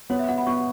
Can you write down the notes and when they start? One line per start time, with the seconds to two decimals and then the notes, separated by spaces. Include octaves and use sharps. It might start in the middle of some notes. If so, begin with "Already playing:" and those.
0.10 B3 C#5
0.19 E5
0.28 B3 F#5
0.38 B5
0.47 B3 C#6